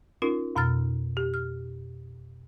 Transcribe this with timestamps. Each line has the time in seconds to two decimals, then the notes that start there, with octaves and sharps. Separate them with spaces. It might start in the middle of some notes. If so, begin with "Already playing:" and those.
0.22 C#4 D#4 F4 A#4
0.56 F2 B2 A#5 E6 F6 A6
1.17 G4
1.34 F6